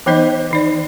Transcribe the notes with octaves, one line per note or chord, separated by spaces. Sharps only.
E3 B3 D#4 C5 D#5
D#3 D#4 D5